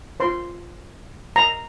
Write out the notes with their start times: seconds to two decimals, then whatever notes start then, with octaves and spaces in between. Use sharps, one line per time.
0.20 F4 C5 C6
1.36 A#5